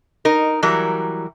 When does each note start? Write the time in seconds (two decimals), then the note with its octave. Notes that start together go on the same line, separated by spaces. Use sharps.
0.25 D#4 A#4
0.63 E3 F#3 G3 A#4